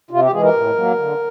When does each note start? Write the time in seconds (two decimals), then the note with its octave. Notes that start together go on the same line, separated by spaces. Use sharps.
0.10 C3 F4
0.22 G4
0.32 E3 G#3 G#4
0.43 A#4
0.54 A2
0.76 F#3 A#3
0.96 D3